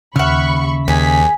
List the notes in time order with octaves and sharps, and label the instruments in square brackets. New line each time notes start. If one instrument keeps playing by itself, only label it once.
[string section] D#2 B5 C#6 [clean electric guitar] C#3 E5 [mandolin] F#5 F6
[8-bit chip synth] D#2 [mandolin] G#4 [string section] B6